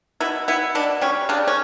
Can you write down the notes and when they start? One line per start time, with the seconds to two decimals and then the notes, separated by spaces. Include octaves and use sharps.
0.20 B2 E4
0.48 B3 E4
0.75 B2 D4
1.01 G3 C#4
1.29 C#3 D4
1.48 C#4